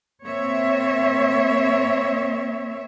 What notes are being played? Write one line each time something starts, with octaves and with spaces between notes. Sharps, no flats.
A#3 C4 C#5 E5